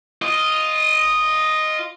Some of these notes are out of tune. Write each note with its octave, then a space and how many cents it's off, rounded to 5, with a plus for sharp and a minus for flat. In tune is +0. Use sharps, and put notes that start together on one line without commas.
F4 +0 D#5 +0